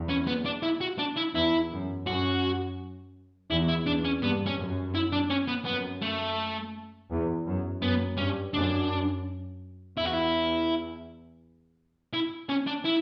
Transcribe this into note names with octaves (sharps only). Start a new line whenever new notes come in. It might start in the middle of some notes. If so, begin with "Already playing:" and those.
Already playing: E2
C#4
B3
D4
E4
F#4
D4
E4
E2 E4
F#2
F#2 F#4
E2 E4
E4
E2 D4
C#4
G2 B3
C#4
F#2
E4
D4
C#4
B3
F#2 B3
A3
E2
F#2
F#2 B3
G2 C#4
F#2 D4
E2 E4
F#4
E4
E4
C#4
D4
E4